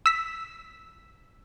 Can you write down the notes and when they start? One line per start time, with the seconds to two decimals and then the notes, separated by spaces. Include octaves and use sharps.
0.06 E6 B6